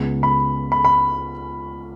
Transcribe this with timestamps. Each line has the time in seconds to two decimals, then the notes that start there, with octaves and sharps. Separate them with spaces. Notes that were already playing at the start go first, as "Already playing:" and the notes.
Already playing: C#2 C#3 B3
0.23 B5
0.72 B5
0.85 B5